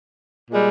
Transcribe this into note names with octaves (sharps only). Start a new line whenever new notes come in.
A#2 G3 G#3